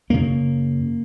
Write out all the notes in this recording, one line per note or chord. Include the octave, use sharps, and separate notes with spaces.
F#2 C#3 A#3